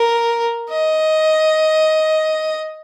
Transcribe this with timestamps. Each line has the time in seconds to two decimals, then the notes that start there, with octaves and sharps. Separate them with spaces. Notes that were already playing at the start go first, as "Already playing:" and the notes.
Already playing: A#4
0.70 D#5